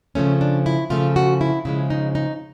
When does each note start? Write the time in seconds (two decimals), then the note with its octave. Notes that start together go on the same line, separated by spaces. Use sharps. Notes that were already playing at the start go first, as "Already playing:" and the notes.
0.15 C#3 F3 A3 C#4
0.41 D4
0.66 E4
0.90 C#3 F3 A3 F4
1.16 F#4
1.41 E4
1.65 C#3 F3 G#3 E4
1.90 D#4
2.15 D#4